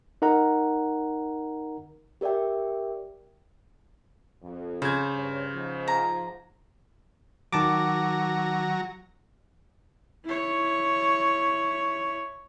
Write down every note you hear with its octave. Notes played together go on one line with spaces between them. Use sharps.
D#4 A#4 F#5 A#5
G4 A#4 D5 E5 G5
F2
C#3 C5 G#6
G2 C#5
G#2 F3
A#5
D#3 F#3 A5 A#5 D6
E4 C#5